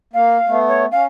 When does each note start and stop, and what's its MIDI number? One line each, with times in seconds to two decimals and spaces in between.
0.13 0.37 58
0.13 0.58 77
0.47 0.86 57
0.47 0.86 59
0.67 0.84 73
0.91 1.06 61
0.91 1.02 77